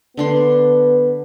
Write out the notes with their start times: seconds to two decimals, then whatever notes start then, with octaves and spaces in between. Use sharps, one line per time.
0.17 D3 B3 D4 C6